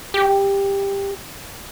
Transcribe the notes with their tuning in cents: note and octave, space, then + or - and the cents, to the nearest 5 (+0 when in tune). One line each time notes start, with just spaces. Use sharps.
G4 +15